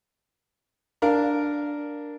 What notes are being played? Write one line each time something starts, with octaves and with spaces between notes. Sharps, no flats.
D4 A#4 F5